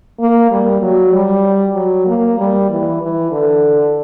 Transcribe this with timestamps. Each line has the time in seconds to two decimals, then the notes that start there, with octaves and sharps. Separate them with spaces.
0.20 A#3
0.51 G3
0.82 F#3
1.13 G3
1.75 F#3
2.07 A#3
2.38 G3
2.70 E3
3.01 E3
3.31 D3